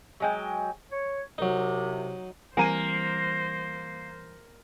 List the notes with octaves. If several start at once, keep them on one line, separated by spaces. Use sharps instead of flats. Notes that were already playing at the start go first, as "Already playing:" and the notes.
F#3 G#3 G5
C#5
C2 C3 F#3 D#4
E3 G3 A#3 C4 C5 G#5 A#5 D#7